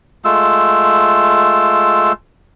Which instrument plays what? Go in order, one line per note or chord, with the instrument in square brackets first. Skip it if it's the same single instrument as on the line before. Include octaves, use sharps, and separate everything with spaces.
[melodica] G#3 A3 F4 E6